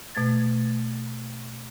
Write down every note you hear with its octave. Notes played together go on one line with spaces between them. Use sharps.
B2 A3 G#6 A6